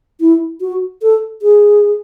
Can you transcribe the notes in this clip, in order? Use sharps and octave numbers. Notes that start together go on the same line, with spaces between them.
E4
F#4
A4
G#4